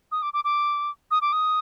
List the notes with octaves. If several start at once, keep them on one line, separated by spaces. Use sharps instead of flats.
D#6
D6
D6
D6
D#6
D6
D#6